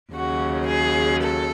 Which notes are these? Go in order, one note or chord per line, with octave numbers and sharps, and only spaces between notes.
D#2 C#3 F#3 F#4
G#4
A4